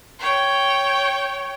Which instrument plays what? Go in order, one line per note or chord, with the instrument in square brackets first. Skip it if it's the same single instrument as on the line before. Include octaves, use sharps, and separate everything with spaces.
[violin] C#5 G5